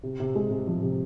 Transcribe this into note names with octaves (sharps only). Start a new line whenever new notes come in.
C3
C3
G#3
C3
F3
C3